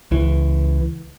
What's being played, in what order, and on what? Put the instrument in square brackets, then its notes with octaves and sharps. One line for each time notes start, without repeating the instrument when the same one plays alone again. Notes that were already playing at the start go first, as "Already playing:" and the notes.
[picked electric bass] C#2 E3